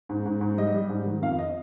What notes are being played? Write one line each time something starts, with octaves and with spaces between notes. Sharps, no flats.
G#2
G#2
G#2
G3 D#5
G3
G#2
D#3
F2 F5
D#5